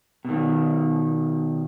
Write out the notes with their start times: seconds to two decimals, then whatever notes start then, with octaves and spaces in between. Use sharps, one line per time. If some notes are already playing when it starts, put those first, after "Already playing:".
0.25 B2 D#3